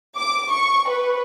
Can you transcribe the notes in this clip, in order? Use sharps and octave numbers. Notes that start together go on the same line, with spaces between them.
D6
C#6
B4